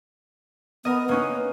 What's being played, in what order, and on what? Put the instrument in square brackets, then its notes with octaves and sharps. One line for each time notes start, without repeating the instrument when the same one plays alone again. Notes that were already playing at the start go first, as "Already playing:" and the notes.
[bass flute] B3 [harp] A#4 D#5
[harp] A#3 C#4 D#4 [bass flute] B4